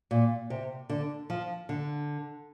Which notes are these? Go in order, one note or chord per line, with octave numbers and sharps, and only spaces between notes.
A#2
C3
D3
F3
D3